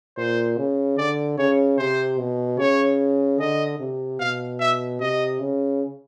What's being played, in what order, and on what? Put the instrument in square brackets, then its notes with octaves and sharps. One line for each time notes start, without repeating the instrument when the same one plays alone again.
[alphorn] A#2 [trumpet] C5
[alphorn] C#3
[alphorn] D3 [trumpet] D5
[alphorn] C#3 [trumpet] C#5
[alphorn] C3 [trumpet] C5
[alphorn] B2
[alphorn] C#3 [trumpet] C#5
[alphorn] D3 [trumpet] D#5
[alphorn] C3
[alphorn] B2 [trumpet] F5
[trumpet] E5
[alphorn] C3 [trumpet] D#5
[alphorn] C#3